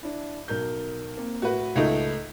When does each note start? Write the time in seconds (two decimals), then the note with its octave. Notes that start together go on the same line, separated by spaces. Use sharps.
0.03 D4 E4
0.48 B1 A#4 G6
1.17 A#3 C4
1.42 A2 F#4 B4
1.75 C#2 A3 D#4